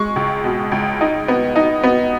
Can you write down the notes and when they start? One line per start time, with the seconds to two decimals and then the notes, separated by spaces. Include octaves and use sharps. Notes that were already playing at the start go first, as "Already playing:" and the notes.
Already playing: G#3 C#6
0.16 C#2
0.44 B2
0.72 C#2
1.01 D#4
1.28 B3
1.56 D#4
1.83 B3